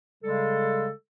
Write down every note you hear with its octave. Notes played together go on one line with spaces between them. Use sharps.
C#3 G3 G#3 A4